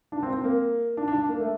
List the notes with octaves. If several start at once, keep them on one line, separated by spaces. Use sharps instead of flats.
D4
C4
C4
A#3
D4
D4
D4
A#3
A3